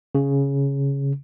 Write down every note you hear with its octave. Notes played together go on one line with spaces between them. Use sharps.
C#3